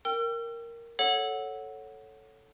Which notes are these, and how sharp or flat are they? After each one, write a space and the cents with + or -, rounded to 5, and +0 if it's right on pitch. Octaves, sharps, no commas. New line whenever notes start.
A#4 +0 G5 +0 E6 +45
A4 +0 C#5 +0 F#5 -5